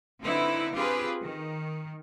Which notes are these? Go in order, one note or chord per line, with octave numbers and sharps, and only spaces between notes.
D3 C4 D#4 E4 B4
C4 F4 G4 G#4 B4
D#3